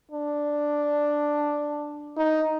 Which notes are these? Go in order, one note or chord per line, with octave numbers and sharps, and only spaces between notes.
D4
D#4